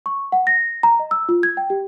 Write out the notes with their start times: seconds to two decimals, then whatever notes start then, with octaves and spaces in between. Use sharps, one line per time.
0.06 C#6
0.32 F#5
0.47 A#6
0.83 A#5
0.99 D#5
1.11 E6
1.29 F4
1.43 G#6
1.57 G5
1.70 G4